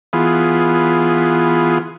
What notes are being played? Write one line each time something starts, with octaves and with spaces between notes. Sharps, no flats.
E3 B3 F4 G#4